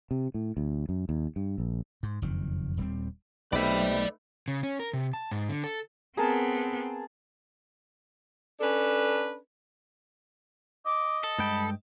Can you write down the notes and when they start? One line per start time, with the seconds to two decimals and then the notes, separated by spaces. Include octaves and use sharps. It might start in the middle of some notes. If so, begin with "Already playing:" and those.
0.11 C3
0.34 A2
0.57 D2
0.89 F#2
1.09 D#2
1.36 G2
1.58 A#1
2.03 G#2
2.22 F#1 F2 D#3
2.77 D#1 G3 C4
3.53 B1 C3 A3 D#4 B4 D5 B5
4.48 C#3
4.63 C#4
4.79 A#4
4.93 C3
5.14 A5
5.31 G#2
5.49 D3
5.64 A4
6.17 B3 C4 G#4 A#4 A5
8.61 C#4 D4 A4 B4
10.86 D#5 D6
11.24 A4
11.38 G2 G#3 G5 B5